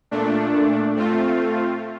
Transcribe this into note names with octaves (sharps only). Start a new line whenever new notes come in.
A#2 A3 D4
A3 C4 F4